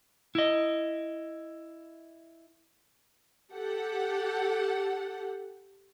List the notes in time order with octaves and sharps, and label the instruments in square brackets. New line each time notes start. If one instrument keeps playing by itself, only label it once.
[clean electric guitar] E4 D#5
[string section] G4 A4 F#5